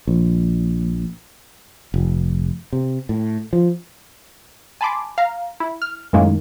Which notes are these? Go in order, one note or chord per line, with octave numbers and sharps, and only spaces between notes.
A#1
F1
C3
A2
F3
G#5 A5 B5 C6 D6
F5 A#5
E4
F6
F#2 A2 D#3 G#3 A#3